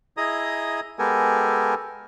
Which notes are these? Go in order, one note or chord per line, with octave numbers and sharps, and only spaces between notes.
E4 G#4 D#5 A#5 D#6
G#3 B3 G4 A4 A#4 G#5